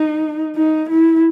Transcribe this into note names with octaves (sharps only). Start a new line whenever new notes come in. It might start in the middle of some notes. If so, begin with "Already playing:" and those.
Already playing: D#4
D#4
E4